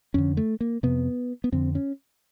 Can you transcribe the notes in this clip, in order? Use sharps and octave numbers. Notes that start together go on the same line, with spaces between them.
F2 D3 C#4
A3
A#3
F2 C3 B3
B3
F2 D3 C4
C#4